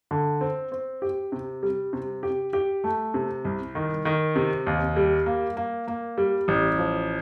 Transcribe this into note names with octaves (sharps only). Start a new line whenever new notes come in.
D3
C4
C4
G4
C3
G3
C3
G4
G4
A3
C3
C2
D#3
D#3
C3
D#2
G3
A#3
A#3
A#3
G3
A1
F3